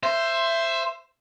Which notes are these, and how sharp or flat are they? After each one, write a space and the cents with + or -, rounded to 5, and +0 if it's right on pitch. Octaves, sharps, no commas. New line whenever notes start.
C5 +0 E5 +20